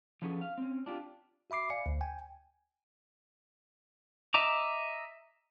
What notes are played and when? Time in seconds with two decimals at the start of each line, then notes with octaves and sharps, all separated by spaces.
0.22 F3 F#3 B3 C#4 G#4 A4
0.41 F5
0.58 C4 C#4
0.86 D4 F4 G4
1.50 F#4 E5 B5 D6 C7
1.70 D5 F5 G#5 C#7
1.86 D2
2.01 G5 G#5
4.34 D#5 E5 A#5 D6